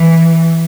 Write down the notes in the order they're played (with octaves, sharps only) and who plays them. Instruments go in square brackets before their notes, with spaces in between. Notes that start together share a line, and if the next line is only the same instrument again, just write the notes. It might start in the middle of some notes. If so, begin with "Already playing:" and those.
Already playing: [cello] E3